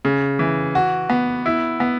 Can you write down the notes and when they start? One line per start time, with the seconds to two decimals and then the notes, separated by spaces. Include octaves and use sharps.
0.05 C#3
0.39 E3
0.75 F#4
1.10 B3
1.46 E4
1.80 B3